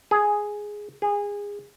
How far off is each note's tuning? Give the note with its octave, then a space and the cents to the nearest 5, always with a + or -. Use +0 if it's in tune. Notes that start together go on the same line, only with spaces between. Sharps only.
G#4 +0
G#4 -25